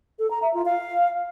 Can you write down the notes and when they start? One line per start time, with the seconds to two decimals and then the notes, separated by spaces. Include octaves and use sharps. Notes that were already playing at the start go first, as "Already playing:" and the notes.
0.19 A4
0.31 A#5
0.42 E5
0.54 F4
0.66 F5